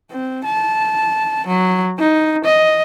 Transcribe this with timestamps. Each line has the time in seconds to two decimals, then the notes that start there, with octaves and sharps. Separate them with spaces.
0.11 C4
0.45 A5
1.47 F#3
1.98 D#4
2.45 D#5